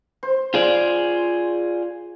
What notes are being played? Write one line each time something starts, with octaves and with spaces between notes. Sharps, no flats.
C5
F4 G#4 D5